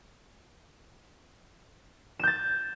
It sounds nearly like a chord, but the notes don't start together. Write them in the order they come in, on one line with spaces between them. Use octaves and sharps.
E7 G6 A6